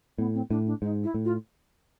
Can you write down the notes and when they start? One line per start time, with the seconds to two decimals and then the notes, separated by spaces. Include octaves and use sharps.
0.18 A2 B3
0.34 C4
0.50 A2 D4
0.66 D4
0.82 G#2 D#4
1.04 E4
1.14 A2
1.25 F4